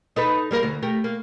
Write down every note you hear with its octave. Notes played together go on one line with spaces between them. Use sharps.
D#4 A4 B4
G3 A#3 A#4
D2
A3 G4 A#4
A#3